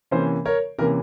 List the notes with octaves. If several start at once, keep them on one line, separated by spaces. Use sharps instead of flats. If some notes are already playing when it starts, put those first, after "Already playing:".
C3 E3 A#3 C#4 C5
A#4 C#5
C3 E3 A#3 C#4 A#4